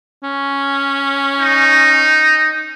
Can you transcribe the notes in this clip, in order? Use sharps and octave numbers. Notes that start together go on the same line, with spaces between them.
C#4
D#4